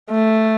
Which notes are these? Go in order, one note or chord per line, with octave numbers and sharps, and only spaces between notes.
A3